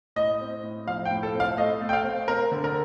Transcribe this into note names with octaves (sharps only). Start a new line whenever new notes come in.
A2 D#5
C4
A2
F3 F5
G5
A2
A4
C4
F5
A3 D#5
A3
G5
F5
C4
C4 A#4
D3
A#4